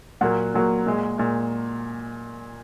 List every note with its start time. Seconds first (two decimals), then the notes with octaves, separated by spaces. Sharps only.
0.21 A#2 F#3 A#3 F#5
0.54 A#2 F#3 A#3
0.86 A#2 G#3
1.18 A#2 G#3